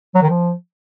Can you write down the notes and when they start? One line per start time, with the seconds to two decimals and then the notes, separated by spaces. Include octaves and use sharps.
0.15 F#3
0.22 D#3
0.30 F3